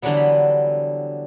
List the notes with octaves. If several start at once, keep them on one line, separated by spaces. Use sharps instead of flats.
D3 E3 F#3 G3 B3
B5